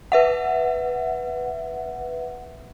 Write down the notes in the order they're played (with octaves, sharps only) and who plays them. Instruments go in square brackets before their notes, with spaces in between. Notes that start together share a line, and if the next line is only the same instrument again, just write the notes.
[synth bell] B4 E5 F#5